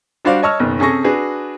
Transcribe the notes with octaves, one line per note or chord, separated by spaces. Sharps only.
G3 D4 F#4 C5 D5 F5
C#5 D#5 A5 C#6 E6 F6
F#1 B2 D#3
C3 C#4 G#4 A4 C#6 A#6
D4 F#4 G#4 B4